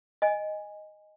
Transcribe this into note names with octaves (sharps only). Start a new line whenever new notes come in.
D#5 G#5